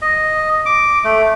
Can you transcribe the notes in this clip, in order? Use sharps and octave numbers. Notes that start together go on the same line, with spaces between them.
D#5
D6
A3